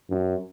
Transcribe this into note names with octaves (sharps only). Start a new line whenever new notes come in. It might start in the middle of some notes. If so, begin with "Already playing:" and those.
F#2